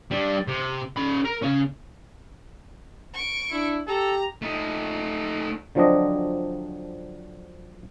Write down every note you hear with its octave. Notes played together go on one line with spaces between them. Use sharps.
G3 D4
C3
C#4 B5
A#4
C#3 C#4
C#6 D7
D4 E4
G4 A4 A#5
A3 D#4
D3 F3 F#3 C4 D4 D#5